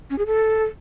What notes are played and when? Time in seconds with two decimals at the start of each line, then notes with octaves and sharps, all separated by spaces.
0.10 C#4
0.18 G#4
0.26 A4